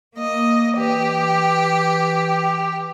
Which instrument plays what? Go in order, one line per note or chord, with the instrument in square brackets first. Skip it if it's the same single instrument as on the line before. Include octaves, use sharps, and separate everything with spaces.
[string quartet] A#3 D#5
[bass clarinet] E3 [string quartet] G4